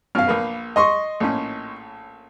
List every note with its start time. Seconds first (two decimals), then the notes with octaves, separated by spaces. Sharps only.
0.15 F#2 B2 F5 F6
0.27 A#1 A#3 B4
0.76 D#5 C6 C#6
1.20 A#1 A2 C#4